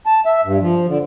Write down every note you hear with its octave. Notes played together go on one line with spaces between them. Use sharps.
A5
E5
G2
F3
D3